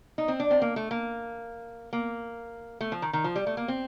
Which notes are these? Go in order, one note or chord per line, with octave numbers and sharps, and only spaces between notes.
D#4
C4
D4
C4
A#3
A3
A#3
A#3
A3
F3
D#3
D#3
F3
G3
A3
A#3
C4